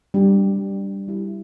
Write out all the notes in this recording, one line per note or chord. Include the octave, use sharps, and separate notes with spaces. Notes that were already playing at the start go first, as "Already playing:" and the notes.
G3 D4 G4
G3 E4 G4